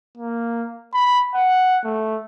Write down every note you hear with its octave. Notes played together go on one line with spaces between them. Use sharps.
A#3
B5
F#5
A3